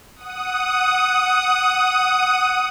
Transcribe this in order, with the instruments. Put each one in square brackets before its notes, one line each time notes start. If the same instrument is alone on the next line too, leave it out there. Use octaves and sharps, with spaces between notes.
[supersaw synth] F#5 D#6